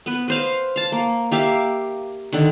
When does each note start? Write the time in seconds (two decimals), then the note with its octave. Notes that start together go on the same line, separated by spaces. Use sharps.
0.06 B3 B4
0.28 B4 C5 F5
0.76 F5 A5
0.92 A#3
1.31 A#3 G4 E5 F5
2.33 D3 D#3